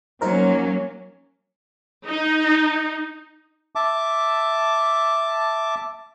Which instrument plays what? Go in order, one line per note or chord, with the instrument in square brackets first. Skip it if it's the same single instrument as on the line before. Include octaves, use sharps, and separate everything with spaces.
[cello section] F#3 A#3 C#4 [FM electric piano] D#4 A#4 C5
[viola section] D#4
[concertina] E5 A5 D6